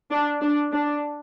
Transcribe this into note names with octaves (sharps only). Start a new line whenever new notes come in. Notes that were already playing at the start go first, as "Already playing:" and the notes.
D4
D4
D4